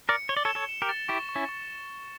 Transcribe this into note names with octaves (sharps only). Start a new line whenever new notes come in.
A#4 D5 C#7
C#5 G7
D5
A4 C#5
E7
A4 C#5
E7
G4 A#4
A6
E4 G4 C#6
C#6
C#4 E4
C#6